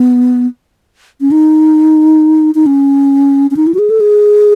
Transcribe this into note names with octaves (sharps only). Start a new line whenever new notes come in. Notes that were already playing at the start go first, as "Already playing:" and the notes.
Already playing: B3
C#4
D#4
D#4
C#4
C#4
D#4
E4
F#4
G#4
A4
G#4